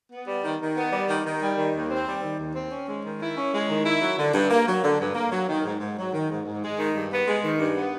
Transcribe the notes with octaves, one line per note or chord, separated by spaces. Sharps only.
B3
G3
D#3
D#3
B3
G3
D#3
D#3
G3
D#3
D#2
C4
G3
D#3
D#2
C4
C#4
G#3
D#3
E4
C#4
G#3
D#3
E4
F#3
D3
G2
A#3
F#3
D3
G2
A#3
F#3
D#3
G#2
G#2
F#3
D#3
G#2
G#2
G#3
D#3
G2
B3
G#3
D#3
G2
B3